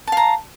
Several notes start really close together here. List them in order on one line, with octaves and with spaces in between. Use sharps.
A5 F5 A#5